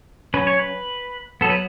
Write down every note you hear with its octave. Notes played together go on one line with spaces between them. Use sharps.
F#3 C#4 B4
C#5
B4
F#3 B3 A4
B4